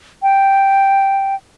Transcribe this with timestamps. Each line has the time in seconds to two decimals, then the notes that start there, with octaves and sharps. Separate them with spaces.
0.23 G5